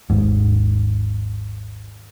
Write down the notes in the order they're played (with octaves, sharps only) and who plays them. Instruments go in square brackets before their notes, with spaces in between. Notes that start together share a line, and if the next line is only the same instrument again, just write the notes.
[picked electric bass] G#1 D#2 G#2